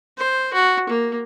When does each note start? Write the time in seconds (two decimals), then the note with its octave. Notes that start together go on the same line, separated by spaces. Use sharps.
0.18 C5
0.53 F#4
0.89 A#3